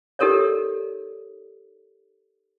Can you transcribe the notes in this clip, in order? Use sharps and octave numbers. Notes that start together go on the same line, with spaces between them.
D#4 G4 A4 A#4 C#5 D5